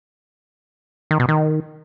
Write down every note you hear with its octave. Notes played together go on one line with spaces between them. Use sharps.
D#3
B2
D#3